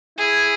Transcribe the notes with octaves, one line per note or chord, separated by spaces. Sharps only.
E4 G#4